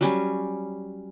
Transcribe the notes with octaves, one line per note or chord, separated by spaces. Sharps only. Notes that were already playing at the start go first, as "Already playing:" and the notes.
F#3 G3 C#4